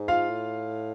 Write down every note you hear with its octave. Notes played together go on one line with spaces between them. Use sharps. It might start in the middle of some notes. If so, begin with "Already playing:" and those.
Already playing: G#2
F4 F5
A2